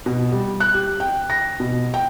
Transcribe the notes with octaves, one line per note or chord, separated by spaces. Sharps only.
B2
G3
F#6
G4
G5
A#6
B2
G5